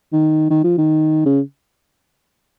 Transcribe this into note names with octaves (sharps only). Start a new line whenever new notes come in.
D#3
D#3
F3
D#3
C#3